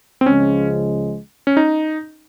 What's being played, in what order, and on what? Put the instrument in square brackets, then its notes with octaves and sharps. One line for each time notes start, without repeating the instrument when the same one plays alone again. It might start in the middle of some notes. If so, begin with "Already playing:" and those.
[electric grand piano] C4
[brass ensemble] C#2 C#3 F3 G#3 [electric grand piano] C#4
[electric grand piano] C#4
D#4